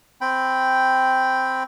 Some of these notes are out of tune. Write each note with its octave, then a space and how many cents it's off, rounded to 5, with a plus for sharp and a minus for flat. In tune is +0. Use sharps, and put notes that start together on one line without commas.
C4 +0 G5 +0 B5 +10